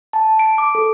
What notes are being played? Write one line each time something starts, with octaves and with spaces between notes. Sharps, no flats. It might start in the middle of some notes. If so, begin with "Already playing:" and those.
A5
D7
D6
A4